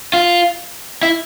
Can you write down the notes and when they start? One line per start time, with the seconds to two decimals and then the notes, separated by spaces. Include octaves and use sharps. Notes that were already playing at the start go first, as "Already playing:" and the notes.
0.14 F4
1.03 E4